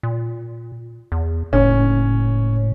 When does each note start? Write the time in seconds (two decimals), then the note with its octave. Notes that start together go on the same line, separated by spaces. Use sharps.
0.03 A#2
1.12 E2
1.53 F#1 A2 C#4